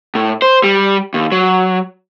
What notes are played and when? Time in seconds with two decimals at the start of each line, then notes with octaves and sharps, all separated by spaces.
0.15 A2
0.42 C5
0.64 G3
1.14 D#2
1.32 F#3